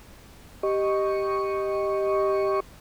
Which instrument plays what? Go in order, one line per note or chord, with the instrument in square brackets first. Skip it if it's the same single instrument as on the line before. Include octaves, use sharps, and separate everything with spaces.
[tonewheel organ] G4 D#5 C#6